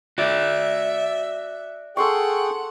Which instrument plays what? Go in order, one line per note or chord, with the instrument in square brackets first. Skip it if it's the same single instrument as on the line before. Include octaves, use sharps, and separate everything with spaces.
[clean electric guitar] F#4 D5 [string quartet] E5
[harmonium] G#4 G5 [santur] A4 C6 C#6 [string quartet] F#5